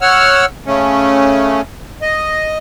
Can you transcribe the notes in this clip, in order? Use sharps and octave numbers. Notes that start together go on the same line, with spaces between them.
C#5 F#5 E6 F6
C#3 A3 C#4
D#5